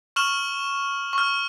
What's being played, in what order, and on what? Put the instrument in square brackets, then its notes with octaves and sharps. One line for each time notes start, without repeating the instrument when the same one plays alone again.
[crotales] C#6 F6 E7 F#7
C#6 F6